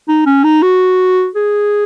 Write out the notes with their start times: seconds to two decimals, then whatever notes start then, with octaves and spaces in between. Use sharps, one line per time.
0.08 D#4
0.26 C#4
0.44 D#4
0.63 F#4
1.35 G#4